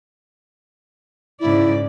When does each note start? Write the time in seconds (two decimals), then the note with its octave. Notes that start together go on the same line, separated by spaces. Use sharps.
1.40 G#2 C#3 E4 D5